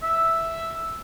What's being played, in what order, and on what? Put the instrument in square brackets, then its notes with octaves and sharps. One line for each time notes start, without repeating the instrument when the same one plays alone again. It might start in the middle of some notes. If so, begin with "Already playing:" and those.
[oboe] E5